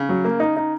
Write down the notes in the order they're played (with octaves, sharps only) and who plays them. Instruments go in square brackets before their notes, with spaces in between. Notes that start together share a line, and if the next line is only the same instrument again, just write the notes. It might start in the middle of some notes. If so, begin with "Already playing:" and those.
Already playing: [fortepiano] C#3
[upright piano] F#3
A#3
D#4
D#4